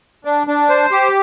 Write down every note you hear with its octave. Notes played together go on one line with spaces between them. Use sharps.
D4
D4
C5
G4